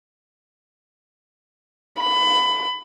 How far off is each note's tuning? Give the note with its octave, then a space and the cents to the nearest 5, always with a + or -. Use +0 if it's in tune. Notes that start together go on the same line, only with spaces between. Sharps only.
B5 +20